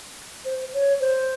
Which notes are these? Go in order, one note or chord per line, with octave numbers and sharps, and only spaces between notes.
C5
C#5
C5